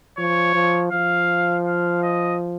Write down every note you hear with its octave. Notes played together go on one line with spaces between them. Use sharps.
F3 C#5
F3
F3 F5
F5
D#5